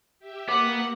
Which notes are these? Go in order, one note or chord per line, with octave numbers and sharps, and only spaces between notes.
G4 E5
A#3 B3 F#5 D6